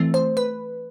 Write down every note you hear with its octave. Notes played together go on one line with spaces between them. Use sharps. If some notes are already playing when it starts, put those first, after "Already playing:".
Already playing: E3 A3 C4
C5
B4